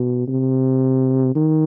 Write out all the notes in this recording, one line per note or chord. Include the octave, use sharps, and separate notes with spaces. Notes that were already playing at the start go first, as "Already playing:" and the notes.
Already playing: B2
C3
D#3